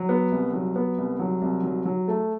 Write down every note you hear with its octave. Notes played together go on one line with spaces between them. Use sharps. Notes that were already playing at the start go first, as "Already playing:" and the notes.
Already playing: F#3
B3
C2
F#3
B3
C2
F#3
C2
F#3
F#3
A3